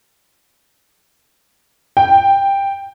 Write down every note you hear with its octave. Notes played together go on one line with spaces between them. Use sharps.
G5